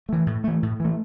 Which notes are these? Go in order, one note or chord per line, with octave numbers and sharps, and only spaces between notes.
E3 A3
A2
E3 A3
A2
E3 A3